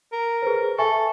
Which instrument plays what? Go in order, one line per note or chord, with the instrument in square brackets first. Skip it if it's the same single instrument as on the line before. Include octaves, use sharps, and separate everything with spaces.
[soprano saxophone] A#4
[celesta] G#4 B4 C5
[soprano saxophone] A4 [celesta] E5 G#5 C#6